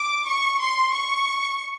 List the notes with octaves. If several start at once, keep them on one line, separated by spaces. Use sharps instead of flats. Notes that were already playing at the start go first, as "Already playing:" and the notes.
Already playing: D6
C#6
C6
C#6